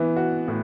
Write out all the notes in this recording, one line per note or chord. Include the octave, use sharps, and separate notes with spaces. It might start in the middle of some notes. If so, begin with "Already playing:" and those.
Already playing: E3 B3
F#4
A2